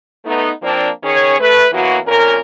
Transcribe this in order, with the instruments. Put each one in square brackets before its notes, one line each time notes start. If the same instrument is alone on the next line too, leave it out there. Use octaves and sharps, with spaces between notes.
[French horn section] A3 B3 D#4
F3 A#3 C4 D4
D#3 C#4 G#4 C#5
A3 B4
E3 F#3 A#3 B3 F#4
F2 A#2 C#4 A#4